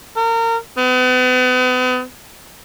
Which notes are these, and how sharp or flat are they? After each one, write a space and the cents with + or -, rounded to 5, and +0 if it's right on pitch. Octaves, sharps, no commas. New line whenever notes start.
A#4 -30
B3 +40